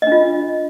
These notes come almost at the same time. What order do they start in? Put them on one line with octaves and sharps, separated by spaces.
D#5 D4 F4